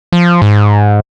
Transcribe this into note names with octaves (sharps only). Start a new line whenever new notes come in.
F3
G#2